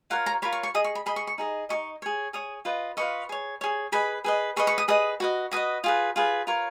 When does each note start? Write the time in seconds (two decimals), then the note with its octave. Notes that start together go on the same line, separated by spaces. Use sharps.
0.10 F4 A#4 C#5 F#5
0.26 A#5
0.42 F4 A#4 C#5 B5
0.53 C#6
0.63 C#6
0.74 G#4 D#5 D#6
0.84 C#6
0.95 B5
1.06 G#4 D#5 B5
1.16 C#6
1.27 C#6
1.38 D#4 G#4 D#5
1.69 D#4 G#4 D#5 C#6
2.02 G#4 C#5
2.33 G#4 C#5 D#6
2.65 F4 B4 D#5
2.97 F4 B4 D#5 C#6
3.29 G#4 C#5
3.61 G#4 C#5
3.92 G#4 B4 D#5 B5
4.24 G#4 B4 D#5
4.56 G#4 B4 D#5 C#6
4.67 C#6
4.78 D#6
4.88 G#4 B4 D#5 D#6
5.20 F#4 B4 D#5
5.51 F#4 B4 D#5 D#6
5.84 F4 G#4 B4
6.16 F4 G#4 B4
6.47 F4 A#4 C#5